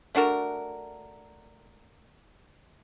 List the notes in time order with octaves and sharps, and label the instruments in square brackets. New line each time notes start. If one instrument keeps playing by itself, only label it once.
[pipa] A3 D4 F#4 A#4